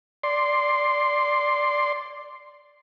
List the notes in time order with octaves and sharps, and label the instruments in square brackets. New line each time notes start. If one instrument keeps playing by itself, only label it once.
[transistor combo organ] D5 C6